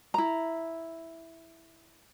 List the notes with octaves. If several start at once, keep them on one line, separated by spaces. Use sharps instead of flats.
E4 A#5